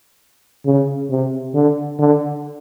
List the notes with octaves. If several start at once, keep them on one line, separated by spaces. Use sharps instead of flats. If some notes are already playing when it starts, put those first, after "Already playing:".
C#3
C3
D3
D3